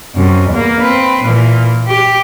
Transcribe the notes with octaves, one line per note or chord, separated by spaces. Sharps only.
F#2 C3
E2 A#3
C4 B4
A#2 E3
G4